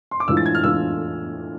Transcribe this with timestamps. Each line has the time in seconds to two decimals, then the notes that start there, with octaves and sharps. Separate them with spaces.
0.11 C6
0.20 D6
0.28 A2 E3 G#3 D4 F4 E6
0.37 A6
0.46 G#6
0.55 F6
0.64 A2 E3 G#3 D4 F4 E6